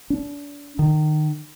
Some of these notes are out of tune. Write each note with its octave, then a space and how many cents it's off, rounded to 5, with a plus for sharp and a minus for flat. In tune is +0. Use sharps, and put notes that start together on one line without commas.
D4 -35
D#3 -25